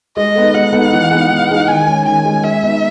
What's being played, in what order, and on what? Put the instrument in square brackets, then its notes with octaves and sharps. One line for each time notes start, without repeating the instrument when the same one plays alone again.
[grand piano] G#3 [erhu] D#5
[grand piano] B3 D#4 A4
[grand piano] G#3 [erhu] F#5
[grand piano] B3 D#4 A4
E3
G#3 B3 D#4 G#4
E3
G#3 B3 D#4 G#4
[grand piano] D#3 [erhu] G#5
[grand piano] G#3 C#4
[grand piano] D#3 [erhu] G#5
[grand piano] G#3 C#4
[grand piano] G#3 [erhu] E5
[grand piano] B3 D#4